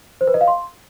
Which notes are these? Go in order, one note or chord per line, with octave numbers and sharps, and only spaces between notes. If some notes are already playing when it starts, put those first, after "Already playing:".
C5
B4
D#5
F5
C6